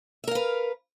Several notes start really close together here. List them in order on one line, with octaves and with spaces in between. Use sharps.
E5 A#4 F5 B4